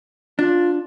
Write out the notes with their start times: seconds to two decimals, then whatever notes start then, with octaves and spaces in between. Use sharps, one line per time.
0.39 D4 F4